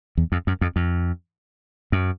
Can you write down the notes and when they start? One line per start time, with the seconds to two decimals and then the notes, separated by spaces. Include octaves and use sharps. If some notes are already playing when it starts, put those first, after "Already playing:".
0.17 E2
0.32 F2
0.47 F#2
0.61 F2
0.76 F2
1.92 F#2